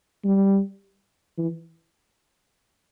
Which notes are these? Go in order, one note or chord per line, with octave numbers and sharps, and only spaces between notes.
G3
E3